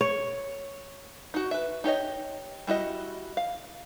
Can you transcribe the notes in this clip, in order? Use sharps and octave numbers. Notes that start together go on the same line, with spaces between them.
C#5
D#4 F#4
B4 E5
D#4 G4 C#5 D#5
G3 E4 F#4 D#5
F5